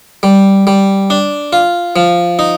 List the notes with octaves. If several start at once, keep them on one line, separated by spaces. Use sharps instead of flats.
G3
G3
D4
F4
F3
D#4